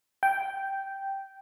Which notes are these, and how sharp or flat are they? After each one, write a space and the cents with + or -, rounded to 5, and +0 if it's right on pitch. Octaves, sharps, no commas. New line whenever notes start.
G5 -5